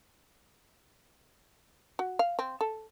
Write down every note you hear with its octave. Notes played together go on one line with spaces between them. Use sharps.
F#4
F5
C4
A4